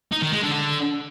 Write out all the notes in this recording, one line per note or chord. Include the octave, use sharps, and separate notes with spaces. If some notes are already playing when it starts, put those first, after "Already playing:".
D#4
D#3
G#3
D3
D3